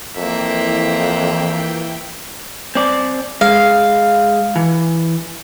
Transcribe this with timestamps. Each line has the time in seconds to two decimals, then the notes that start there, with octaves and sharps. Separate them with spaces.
0.17 F2 E3 A#3 E5 G5
2.75 C4 D5
3.41 G#3 F5
4.56 E3